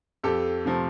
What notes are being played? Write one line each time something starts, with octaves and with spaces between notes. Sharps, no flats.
F2 G4 A4
C3 F3 A3